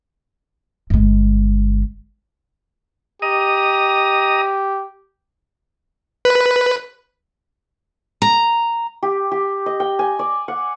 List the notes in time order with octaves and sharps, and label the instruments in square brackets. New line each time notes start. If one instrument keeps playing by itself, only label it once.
[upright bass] G1 G#3
[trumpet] G4 [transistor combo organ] D#5 A#5 D#6
[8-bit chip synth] B4
[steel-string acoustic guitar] A#5
[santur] G4
G4
D#5
G5
G#5
D5
F#5